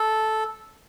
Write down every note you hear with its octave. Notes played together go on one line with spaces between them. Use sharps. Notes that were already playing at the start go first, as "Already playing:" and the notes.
Already playing: A4